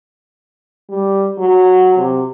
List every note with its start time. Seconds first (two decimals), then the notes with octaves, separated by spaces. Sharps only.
0.89 G3
1.38 F#3
1.97 C3